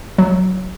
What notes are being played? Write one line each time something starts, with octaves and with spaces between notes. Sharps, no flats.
F#3